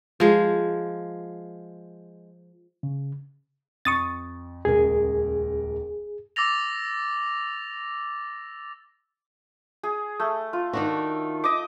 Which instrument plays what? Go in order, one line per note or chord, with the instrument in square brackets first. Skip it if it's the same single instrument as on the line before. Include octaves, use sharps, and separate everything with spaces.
[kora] F3 G#3
[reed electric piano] C#3
[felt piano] F2 [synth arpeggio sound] C#6 D#6 A6
[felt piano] D#1 C#2 A#4 [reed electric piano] G#4
[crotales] D6 E6 A6 A#6 F7
[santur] G#4
A3
F4
[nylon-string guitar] D#3 D4 F#4
[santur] D#5 D6